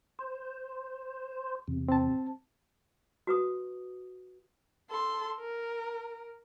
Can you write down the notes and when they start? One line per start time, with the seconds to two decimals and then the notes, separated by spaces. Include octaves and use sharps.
0.19 C5
1.68 E2 C3
1.88 C4 A5
3.27 F#4 B4 D#6
4.90 A4 C6
5.40 A#4